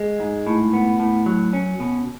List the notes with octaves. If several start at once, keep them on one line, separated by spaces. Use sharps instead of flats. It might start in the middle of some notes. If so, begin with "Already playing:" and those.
Already playing: G#3
G#2
A2
B3
A2
F#3
C#4
B2